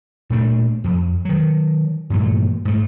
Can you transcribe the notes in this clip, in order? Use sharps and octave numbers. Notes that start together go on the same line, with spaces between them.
A#2 A3 D4
F2
D#3 F#3
G2 A#2 E3 A3
G#2 A3